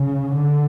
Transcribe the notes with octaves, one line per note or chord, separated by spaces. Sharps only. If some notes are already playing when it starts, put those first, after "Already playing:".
Already playing: C#3
D3